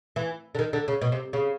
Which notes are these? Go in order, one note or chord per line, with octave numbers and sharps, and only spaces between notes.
E3
D3
D#3
D3
C#3
B2
C3
C#3